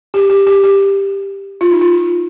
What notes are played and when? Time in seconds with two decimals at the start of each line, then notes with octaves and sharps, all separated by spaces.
0.14 G4
0.30 G4
0.47 G4
0.63 G4
1.61 F4
1.71 D#4
1.81 F4